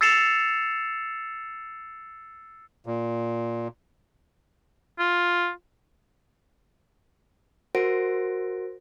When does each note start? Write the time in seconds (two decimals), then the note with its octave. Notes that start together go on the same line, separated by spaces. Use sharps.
0.01 E6 A6 C7 C#7 E7 F7
2.86 A#2
4.99 F4
7.75 F#4 A#4 C5 F#5 A#6 D7